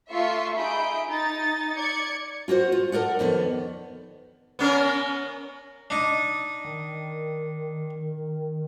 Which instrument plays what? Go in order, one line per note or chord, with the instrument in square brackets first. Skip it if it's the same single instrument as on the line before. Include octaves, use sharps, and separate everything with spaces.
[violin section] A3 F4 E5 C6 C#6
D#4 G#4 E5 B5 G6 D7
D#4 A6
D5 G#6 C#7
[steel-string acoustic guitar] F4 F#4 A4 C5
F4
A4 A#4 D5 F#5
F2 D#3 B3 D5
[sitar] B3 C#4 A#4
[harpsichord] D4 D#4
[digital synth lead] D#3